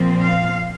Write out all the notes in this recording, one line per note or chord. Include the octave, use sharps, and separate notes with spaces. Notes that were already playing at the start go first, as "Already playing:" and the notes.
Already playing: A#2 F3 C4
F5